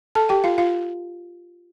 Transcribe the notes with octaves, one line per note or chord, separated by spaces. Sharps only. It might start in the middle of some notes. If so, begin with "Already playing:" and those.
A4 A5
G4 G5
F4 F5
F4 F5